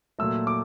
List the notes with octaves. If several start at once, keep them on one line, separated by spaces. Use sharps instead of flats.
A#2 F#3 A3 E6
D6